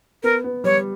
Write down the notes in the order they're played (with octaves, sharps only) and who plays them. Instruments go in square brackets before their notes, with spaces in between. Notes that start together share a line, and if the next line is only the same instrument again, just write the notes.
[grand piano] B3 [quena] A#4
[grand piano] B3
[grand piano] G3 [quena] C#5